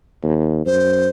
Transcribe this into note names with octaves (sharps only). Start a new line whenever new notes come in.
D#2
F#2 C5